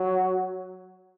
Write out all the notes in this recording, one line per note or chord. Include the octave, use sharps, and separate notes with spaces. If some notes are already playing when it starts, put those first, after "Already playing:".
Already playing: F#3